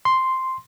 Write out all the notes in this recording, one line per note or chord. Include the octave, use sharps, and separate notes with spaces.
C6